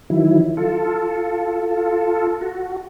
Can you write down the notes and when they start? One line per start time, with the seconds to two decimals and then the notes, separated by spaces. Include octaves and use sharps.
0.10 D#3 E3 F#3 E4
0.57 F4 A4
2.41 F#4